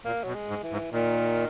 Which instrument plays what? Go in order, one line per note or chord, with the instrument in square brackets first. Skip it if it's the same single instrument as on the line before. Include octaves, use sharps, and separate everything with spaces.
[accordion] A#2 [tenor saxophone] A#3
[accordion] B2 [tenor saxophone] F#3
[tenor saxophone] G#3
[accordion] G#2
[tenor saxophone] E3
[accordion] G#2
[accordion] A#2 [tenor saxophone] D#3